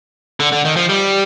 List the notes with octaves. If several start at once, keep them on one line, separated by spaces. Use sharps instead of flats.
D3
D3
D#3
F3
G3